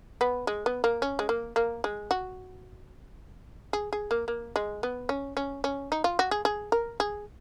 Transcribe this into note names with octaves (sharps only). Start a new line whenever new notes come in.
B3
G#3
B3
A#3
C#4
G#3
A#3
A#3
G#3
F#4
G#4
G#4
A#3
A#3
G#3
B3
C#4
C#4
C#4
D#4
F4
F#4
G#4
G#4
A#4
G#4